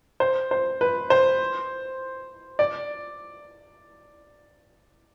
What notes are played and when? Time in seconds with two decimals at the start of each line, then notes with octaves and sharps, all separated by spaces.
0.20 C5
0.51 C5
0.81 B4
1.10 C5
2.59 D5